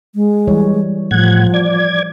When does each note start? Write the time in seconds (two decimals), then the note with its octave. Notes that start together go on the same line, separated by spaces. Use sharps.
0.15 G#3
0.48 E3 G3 C#5
1.11 A2 F3 F#5 G#6
1.54 D5 G#6